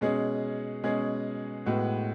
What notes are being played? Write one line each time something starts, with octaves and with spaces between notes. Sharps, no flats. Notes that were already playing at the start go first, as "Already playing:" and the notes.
B2 G#3 C#4 G#4
B2 G#3 C#4 G#4
A2 G#3 B3 F#4